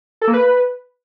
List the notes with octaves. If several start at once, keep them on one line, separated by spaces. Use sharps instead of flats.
A4
A#3
B4